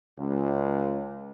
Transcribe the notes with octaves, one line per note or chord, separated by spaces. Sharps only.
C#2